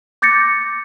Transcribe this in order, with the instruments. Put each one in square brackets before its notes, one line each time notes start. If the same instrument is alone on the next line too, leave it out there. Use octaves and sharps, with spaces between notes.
[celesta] D6 G6 A6 A#6 C#7